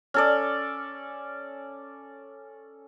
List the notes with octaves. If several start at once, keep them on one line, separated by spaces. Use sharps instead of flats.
C#4 A4 D5